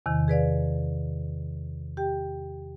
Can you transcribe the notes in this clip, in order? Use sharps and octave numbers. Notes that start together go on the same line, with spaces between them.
E2 C3 D#3
G#4 B4 D5 F5
G4 G5